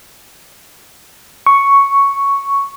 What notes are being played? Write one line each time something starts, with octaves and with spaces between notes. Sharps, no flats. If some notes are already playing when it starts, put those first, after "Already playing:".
C#6